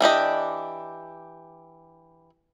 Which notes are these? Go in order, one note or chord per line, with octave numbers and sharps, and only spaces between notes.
E3 D4 G4 D#5